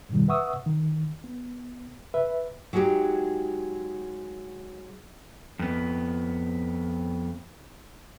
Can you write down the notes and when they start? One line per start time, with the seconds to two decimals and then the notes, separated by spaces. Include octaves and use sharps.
0.09 F2 G#2 B2 D#3 G3
0.28 B4 E5 F#5 C#6 D#6 E6
0.66 D#3
1.24 B3
2.14 B4 E5
2.73 F#3 G#3 D#4 F#4 G4
5.59 F2 B3